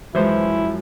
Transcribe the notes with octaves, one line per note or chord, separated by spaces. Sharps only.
F#2 E3 F3 G#3 E4 C5